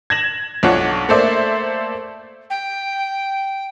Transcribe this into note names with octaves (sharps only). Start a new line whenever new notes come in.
G#6 A#6 E7 F#7
B1 D4 F4 C#5 F#5
A3 A#3 A4 C5 D5 E5
G5